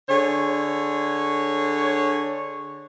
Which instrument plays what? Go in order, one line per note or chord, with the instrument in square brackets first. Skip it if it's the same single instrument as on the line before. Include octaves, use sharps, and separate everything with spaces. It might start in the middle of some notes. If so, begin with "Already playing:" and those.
[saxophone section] D3 G#4 C#5